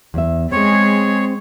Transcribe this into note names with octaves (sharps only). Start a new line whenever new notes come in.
E2 E5
G#3 C4 G#4 C#5